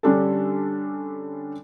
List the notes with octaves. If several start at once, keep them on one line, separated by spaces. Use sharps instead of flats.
D3 G3 C#4 D4 G4 A4